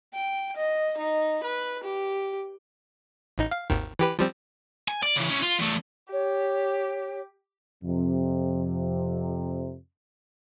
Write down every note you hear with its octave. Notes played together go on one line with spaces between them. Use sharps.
G5
D#5
D#4
B4
G4
A1 D#4
F5
G#1 D#2 D#3
E3 G4 B4
F3 G3 C4
G#5
D5
C#3 E3
C#4 E4
F4
E2 A3
G4 C#5
F2 C3